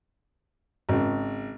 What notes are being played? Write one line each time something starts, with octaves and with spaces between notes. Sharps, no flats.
G#1 C#3